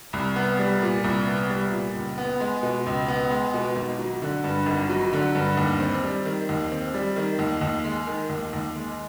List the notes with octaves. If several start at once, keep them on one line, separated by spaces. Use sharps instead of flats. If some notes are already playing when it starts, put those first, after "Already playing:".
C2
B3
G3
A#2
C2
B3
G3
A#2
C#2
B3
G#3
B2
C#2
B3
G#3
B2
G#1
F#3
D3
G2
G#1
F#3
D3
G2
D#2
C4
G3
D#3
D#2
C4
G3
D#3
D#2
D#2
G#3
D#3
D#2
D#2
G#3